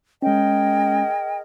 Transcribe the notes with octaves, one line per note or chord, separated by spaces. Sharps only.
G#3 C#4 G#4 A#4 D#5 G5